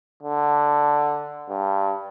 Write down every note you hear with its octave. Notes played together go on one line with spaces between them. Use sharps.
D3
G2